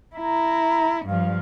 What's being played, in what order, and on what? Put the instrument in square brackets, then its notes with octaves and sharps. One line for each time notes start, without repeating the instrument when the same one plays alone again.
[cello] E4 [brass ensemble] A#5
[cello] G2 F3 [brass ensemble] F5